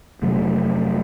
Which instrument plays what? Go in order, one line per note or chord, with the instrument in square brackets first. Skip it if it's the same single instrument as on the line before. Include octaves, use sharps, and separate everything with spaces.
[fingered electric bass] F1 C3 F#3 A3